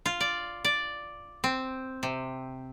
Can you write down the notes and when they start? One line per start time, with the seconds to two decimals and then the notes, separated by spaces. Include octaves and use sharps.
0.06 F4
0.20 D5
0.65 D5
1.44 C4
2.03 C3